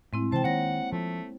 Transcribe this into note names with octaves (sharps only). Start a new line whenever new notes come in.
A2 G#3 C4 E4
C3 E3 C5 G5 A5
D#3 A#3 C#5 F#5 A#6
F3 A3